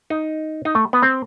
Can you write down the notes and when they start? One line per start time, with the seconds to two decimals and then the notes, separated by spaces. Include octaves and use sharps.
0.10 D#4
0.65 D#4
0.75 A3
0.93 B3
1.03 C4